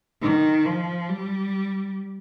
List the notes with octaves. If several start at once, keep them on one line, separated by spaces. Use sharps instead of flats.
D#3
F3
G3